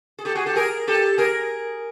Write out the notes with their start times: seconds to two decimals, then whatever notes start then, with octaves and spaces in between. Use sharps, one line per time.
0.19 G#4
0.25 G4 A4
0.35 F#4 G#4
0.46 G4 A4
0.56 G#4 A#4
0.87 G4 A4
1.18 G#4 A#4